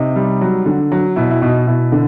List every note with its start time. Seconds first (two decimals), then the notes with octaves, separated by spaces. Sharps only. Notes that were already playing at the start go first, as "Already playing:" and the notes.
Already playing: C3 D#4
0.16 G3
0.41 F#3
0.66 D3
0.92 F#3
1.16 B2 E4
1.30 E4
1.42 B2 D#4
1.67 B2 E4
1.92 D3